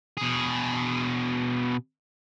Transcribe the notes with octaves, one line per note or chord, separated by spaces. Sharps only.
B2 G#4